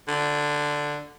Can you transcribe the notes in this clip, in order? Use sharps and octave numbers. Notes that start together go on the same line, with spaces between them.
D3